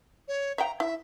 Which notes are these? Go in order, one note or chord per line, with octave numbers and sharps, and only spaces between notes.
C#5
E5 F5 G5 A#5
E4 E5